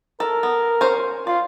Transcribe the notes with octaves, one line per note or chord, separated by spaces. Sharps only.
A4 A#4
B3
C#4 C5
F4 D5